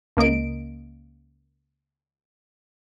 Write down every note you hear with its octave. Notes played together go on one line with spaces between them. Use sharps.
C#2 A#3 D#5 D7